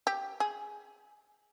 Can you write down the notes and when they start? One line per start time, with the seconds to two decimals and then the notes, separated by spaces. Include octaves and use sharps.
0.07 G4
0.40 G#4